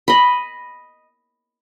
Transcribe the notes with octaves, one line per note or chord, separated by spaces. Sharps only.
D#5 B5